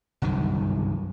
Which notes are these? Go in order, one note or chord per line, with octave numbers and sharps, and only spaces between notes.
G1 C2 F#2 D#3